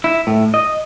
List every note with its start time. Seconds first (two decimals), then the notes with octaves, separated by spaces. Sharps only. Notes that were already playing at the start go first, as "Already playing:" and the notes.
0.04 E4
0.27 A2
0.54 D#5